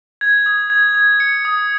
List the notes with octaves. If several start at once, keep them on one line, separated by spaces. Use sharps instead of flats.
G#6
D#6
G#6
G#6
C#7
D#6